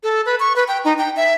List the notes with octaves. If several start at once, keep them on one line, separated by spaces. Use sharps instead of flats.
A4
B4
C#6
B4
G5
D#4
G5
E5